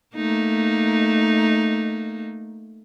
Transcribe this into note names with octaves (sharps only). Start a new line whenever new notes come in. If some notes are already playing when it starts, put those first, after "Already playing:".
A3 A#3 D#4